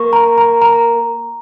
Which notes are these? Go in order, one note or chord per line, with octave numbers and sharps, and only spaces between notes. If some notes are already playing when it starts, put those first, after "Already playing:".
Already playing: A#3 C#6
A#5
A#5
A#5